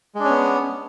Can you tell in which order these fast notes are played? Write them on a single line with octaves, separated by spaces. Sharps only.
G#3 D4 C#4 B3